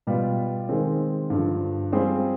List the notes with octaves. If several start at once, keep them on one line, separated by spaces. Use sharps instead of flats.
B2 G3 B3 F4
D#3 G#3 C4
G2 D3 F3
G3 C4 F4 G#4 C5